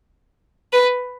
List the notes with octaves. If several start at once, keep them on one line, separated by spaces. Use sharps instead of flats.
B4